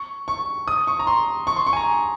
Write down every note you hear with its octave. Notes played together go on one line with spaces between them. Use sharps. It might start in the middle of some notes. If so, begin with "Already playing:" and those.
Already playing: C#6
C#6
D#6
C#6
A#5
C6
C#6
C6
C#6
G#5
A#5